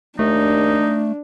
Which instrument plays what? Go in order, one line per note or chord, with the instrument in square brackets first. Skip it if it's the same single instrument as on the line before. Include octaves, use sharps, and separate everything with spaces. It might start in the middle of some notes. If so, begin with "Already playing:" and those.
[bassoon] D#2 [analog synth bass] A3 [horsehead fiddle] D4 [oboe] D#4